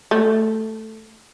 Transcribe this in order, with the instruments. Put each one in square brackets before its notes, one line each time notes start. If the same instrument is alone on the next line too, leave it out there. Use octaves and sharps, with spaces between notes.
[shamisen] A3